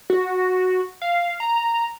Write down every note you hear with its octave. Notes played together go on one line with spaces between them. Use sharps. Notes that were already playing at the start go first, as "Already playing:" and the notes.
F#4
F5
A#5